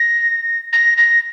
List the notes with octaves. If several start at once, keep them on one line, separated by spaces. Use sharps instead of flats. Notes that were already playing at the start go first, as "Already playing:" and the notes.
Already playing: A#6
A#6
A#6